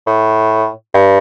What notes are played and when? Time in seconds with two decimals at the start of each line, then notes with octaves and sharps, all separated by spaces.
0.07 A2
0.94 G2